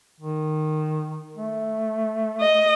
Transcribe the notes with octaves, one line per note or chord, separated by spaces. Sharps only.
D#3
A3
D#5